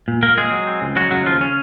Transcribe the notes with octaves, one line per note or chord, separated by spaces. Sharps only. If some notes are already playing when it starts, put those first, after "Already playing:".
A#2
A#2 A#3 A#4
G#3 C4 G#4
F#3
C4
C#2
F#3 G#3 F#4
C#3 F#3 F#4
D#2 F3 F4
C#4